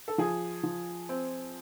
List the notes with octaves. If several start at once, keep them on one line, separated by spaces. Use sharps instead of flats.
A4
F3 G#4
F3
C4